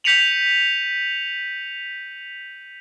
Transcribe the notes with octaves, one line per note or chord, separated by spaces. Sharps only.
G6 B6 C#7 D#7 F7 F#7